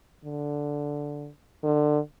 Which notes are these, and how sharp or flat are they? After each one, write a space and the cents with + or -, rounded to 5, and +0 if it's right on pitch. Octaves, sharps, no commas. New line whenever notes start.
D3 -5
D3 +25